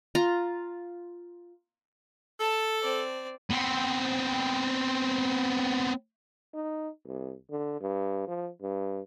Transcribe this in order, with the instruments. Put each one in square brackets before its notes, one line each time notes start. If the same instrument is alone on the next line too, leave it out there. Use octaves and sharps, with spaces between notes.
[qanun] F4 A#5
[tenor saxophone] A4 [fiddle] A5
[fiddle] C4 D5
[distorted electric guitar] B3 C4
[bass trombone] D#4
C2
D3
G2
F3
G2